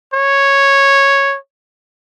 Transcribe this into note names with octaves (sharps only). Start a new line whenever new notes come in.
C#5